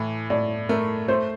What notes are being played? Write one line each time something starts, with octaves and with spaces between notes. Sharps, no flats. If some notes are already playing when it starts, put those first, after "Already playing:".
Already playing: A2 E3
A2 D5
A3 A#4
A3 C5